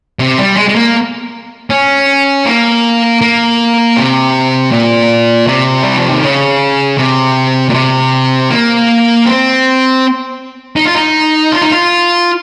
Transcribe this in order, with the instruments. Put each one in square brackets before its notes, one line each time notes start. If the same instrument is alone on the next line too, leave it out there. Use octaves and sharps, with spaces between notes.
[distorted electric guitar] C3
G3
G#3
G#3
A#3
C#4
A#3
A#3
C3
A#2
C3
G3
F3
D#3
C#3
C3
A#2
C3
A#3
C4
D#4
F4
D#4
F4
D#4
F4